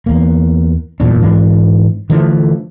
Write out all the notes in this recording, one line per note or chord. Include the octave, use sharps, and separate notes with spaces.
E2 A#3
F#1 E2 A#2 D4
G#2 E3 C4 D4
D3 E3 F3 A3